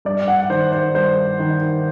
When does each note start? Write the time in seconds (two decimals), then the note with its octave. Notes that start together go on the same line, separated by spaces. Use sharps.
0.05 G2 D5
0.28 F#5
0.50 D#3 C5
0.72 C5
0.95 G2 C5
1.39 D#3